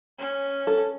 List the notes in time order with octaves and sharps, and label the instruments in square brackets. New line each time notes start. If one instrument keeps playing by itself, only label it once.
[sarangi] C#4
[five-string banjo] A4